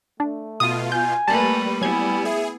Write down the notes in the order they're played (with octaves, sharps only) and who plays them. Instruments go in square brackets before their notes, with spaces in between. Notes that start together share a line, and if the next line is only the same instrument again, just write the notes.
[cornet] A3 [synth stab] D4
[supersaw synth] B2 F4 [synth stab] D#6
[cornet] G#5 [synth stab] G6
[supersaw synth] G3 [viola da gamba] A3 A#3 B4 [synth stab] A5
[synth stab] F#3 G#6 [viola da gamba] B3 E4 [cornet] G#5
[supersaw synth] G#4 [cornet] E5